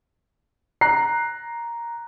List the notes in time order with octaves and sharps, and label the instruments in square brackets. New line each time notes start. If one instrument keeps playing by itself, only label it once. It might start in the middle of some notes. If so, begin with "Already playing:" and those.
[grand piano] A#5 F#6 C7